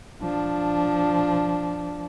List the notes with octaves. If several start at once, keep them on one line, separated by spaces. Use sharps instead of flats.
F3 D4